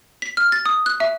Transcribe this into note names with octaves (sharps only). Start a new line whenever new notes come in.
B6
F6
A6
D#6
F#6
E5